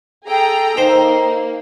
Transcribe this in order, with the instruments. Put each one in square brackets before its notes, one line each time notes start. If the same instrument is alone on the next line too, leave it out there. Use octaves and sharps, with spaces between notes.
[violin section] G#4 G5 A#5 [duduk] A4
[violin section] A#3 [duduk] D#4 [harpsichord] C5